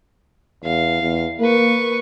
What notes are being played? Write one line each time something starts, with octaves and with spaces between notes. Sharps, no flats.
E2 F5
E2
A#3 B4 C#6